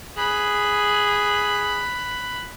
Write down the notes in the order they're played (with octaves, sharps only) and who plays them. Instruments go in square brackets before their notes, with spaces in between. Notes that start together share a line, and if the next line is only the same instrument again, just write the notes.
[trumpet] G#4 [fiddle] B5 F#6